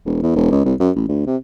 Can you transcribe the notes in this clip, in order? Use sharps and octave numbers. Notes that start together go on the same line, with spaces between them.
E1
E2
E1
C#2
C2
F#2
A1
D2
C3